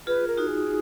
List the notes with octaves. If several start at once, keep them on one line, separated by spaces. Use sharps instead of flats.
F4 G#4 B4
A#4
D#4 F#4
G#4